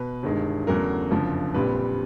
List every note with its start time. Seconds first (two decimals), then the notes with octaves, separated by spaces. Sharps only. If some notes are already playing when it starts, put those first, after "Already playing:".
Already playing: B2 B4
0.23 G1 G2 D#3 G#3
0.67 E2 C#3 F#3 A3 A#4
1.11 F#1 F2 D3 F3
1.54 A#1 A#2 G3 C4 B4